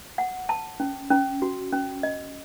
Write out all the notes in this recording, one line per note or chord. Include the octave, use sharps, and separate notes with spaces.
F#5
A5
C#4
C#4
F#4
C#4
D#5